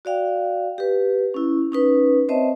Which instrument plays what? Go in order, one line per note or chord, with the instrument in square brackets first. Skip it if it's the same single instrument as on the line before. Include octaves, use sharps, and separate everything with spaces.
[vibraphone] F#4 D5 F5 G5
G4 B4
C#4 E4
C#4 D#4 B4
C4 C5 C#5 D#5 E5 A5